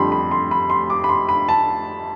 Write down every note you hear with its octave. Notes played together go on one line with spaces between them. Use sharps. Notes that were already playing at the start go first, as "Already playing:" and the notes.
Already playing: F2 D3 G3 B5 C6
B5
C6
B5
C6
D6
B5
C6
B5
A5